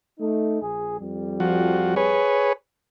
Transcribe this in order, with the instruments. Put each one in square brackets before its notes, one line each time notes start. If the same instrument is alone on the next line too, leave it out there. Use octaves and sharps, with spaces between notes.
[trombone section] A3 D#4
A#1 G#4
F2 G3
[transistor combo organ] F3 F#4
G#4 B4 C#5